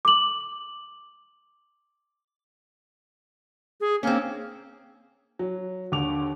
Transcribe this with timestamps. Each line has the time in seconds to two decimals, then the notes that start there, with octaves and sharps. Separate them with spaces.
0.05 D6 F#7
3.81 G#4
4.03 A#3 C4 C#4
5.39 F#3
5.92 D#2 D3 D6 F7